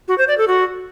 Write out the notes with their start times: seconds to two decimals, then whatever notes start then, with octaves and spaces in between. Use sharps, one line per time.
0.08 F#4
0.18 C5
0.28 D5
0.38 A4
0.48 F#4